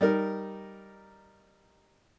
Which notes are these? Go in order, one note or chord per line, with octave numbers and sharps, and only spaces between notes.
G3 D#4 A#4